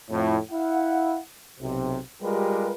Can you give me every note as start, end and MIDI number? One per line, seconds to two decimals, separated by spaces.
0.11 0.38 41
0.11 0.38 45
0.52 1.19 64
0.52 1.19 77
0.52 1.19 78
1.60 1.98 35
1.60 1.98 48
2.22 2.74 55
2.22 2.74 56
2.22 2.74 65
2.22 2.74 67
2.22 2.74 70
2.22 2.74 71